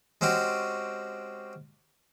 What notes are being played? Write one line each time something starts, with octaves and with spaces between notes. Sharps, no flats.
G#3 C4 C#4 F#4 G4